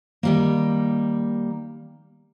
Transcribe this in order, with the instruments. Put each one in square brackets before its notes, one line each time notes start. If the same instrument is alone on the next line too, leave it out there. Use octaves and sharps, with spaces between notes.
[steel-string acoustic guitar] D#3 G3 A#3